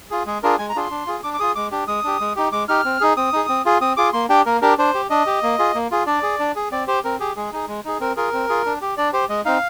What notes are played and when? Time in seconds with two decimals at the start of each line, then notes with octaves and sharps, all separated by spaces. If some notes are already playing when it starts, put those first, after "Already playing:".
0.11 F4 G#4
0.26 G#3 G#4
0.43 D4 F4 G#4 A#4
0.58 G#3 G#5
0.69 A#5
0.76 D4 F4 G#4 C6
0.91 D4
1.07 F4 G#4
1.23 D4 D6
1.34 D6
1.40 F4 G#4 D#6
1.56 G#3 D6
1.71 D4 G4
1.87 G#3 D#6
2.04 D4 G4
2.20 G#3
2.36 D#4 G4
2.52 G#3 D6
2.68 D#4 G4 F6
2.85 C4
3.01 D#4 G#4
3.17 C4 D#6
3.33 D#4 G#4
3.49 C4
3.66 F4 G#4
3.81 C4 D#6
3.97 F4 G#4 D6
4.13 A#3 C6
4.29 D4 G4 G5
4.46 A#3 A#4
4.62 D4 G4 A#4
4.78 D4 C5
4.94 G4
5.10 D4 D#5
5.26 G4
5.43 A#3
5.59 F4 G#4
5.75 A#3
5.91 F4 G#4
6.06 D4 D5
6.23 G#4
6.39 D4
6.56 G#4
6.72 C4 D5
6.87 G4 C5
7.04 C4 A#4
7.20 G4 G#4
7.36 G#3 G#4
7.53 D#4 G#4
7.68 G#3
7.84 D#4 G#4
8.00 C4 A#4
8.17 F4 G#4 A#4
8.33 C4
8.49 F4 G#4
8.66 D4
8.81 G4
8.97 D4 D5
9.13 G4 C5
9.29 G#3 D#5
9.45 C4 D#4 F5